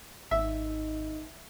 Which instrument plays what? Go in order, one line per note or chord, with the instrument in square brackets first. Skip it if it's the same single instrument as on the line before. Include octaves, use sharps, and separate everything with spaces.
[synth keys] G#1 [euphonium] D#4 [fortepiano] E5